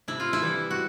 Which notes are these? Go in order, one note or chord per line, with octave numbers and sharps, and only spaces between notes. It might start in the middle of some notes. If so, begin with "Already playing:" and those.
C3 E4
F4
E4
E3 G3
F#4